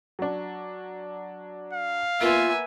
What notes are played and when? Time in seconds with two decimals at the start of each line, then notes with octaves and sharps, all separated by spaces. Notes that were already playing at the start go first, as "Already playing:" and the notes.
0.19 F#3 D4
1.73 F5
2.21 A#3 B3 F4 B4 E5 G#5